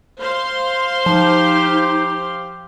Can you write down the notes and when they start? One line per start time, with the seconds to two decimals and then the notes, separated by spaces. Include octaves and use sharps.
0.20 C5 F5 C6
1.06 F3 D#4 G4